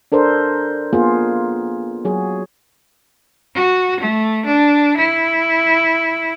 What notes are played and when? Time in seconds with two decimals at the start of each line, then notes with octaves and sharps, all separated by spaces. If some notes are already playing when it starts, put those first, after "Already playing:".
0.12 D4 A4 A#4 C5
0.93 A#3 B3 F4 G#4
2.05 F#3 F#4 G#4
3.55 F#4
4.00 A3
4.45 D4
4.97 E4